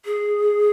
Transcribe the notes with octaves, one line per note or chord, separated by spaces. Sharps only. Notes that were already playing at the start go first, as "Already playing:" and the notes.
G#4